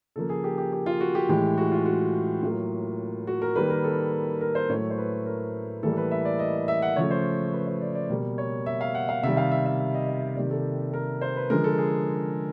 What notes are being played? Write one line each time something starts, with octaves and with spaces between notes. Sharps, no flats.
C#3 F3 A#3 A4
G#4
G4
G4
G4
F4
F#4
G4
A2 E3 G#3 G4
F#4
F4
F#4
A2 F#3 A#3 F4
F#4
A#4
D#3 G3 A#3 B4
A#4
A4
A#4
C5
A2 F#3 A3 C#5
C5
B4
A#4
A2 E3 G3 A#3 A4
B4
E5
D5
D#5
E5
F#5
C#3 F3 A3 C#5
C5
B4
C5
D5
D5
B2 G3 A#3
C#5
E5
F5
F#5
F5
C3 D#3 G3 E5
F5
E5
E5
E5
D#5
E5
D#5
C3 D#3 G3 A#3 D5
A4
A#4
C5
B4
D3 F3 G#3 A#4
A4
G#4